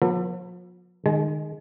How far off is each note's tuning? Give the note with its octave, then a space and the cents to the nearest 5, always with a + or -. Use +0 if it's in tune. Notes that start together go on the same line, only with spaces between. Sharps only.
F3 +40 B3 -35 A4 +35
D#3 -30 G#3 +0 G#5 +45